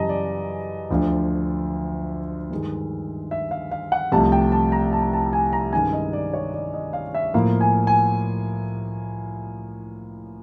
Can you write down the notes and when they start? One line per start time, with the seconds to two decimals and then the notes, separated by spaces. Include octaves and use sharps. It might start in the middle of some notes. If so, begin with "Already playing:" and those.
Already playing: F#2 C#3 E3 G3 D#5 A5 A#5
0.09 D5
0.91 D2 D3 F3
2.51 G2 D#3 G#3
3.31 E5
3.51 F5
3.71 F5
3.92 F#5
4.12 C2 C3 F3 A3 A5
4.32 G5
4.52 A5
4.72 A#5
4.93 A5
5.13 A5
5.33 G#5
5.53 A#5
5.73 G2 D#3 G#3 C#4 G#5
5.93 D#5
6.13 D5
6.33 C#5
6.54 D5
6.74 D#5
6.93 F5
7.15 E5
7.34 A2 F3 A#3 F5
7.61 G#5
7.87 G#5